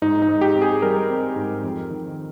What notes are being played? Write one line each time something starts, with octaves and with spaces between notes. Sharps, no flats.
G#2 D#4
D#4
G#2
G4
C4
G#4
G3 A#4
C4
G#2
F2
D#3